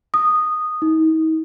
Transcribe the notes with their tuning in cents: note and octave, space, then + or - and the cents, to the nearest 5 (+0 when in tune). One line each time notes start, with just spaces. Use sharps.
D#6 -10
D#4 +40